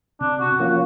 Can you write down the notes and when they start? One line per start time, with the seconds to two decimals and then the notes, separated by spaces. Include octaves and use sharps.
0.21 C3 D4
0.40 F#4
0.59 F3 A#3 C#4 F4 F#4